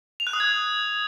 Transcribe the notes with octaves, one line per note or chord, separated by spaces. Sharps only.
F7
F#6
D#6
G#6